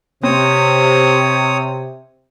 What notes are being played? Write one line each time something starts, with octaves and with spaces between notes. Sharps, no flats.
C3 C4 C#5 D#6